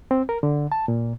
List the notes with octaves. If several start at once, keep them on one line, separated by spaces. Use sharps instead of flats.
C4
A#4
D3
A5
A#2